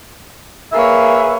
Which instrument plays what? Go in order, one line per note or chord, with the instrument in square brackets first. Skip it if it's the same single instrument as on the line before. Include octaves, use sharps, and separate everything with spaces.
[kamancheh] A#3 C#5 [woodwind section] G#4 B4 E5